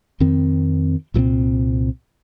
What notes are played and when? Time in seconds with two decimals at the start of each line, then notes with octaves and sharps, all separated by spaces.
0.20 F2 D#3 C4
1.14 C2 A#2 F3
1.18 C4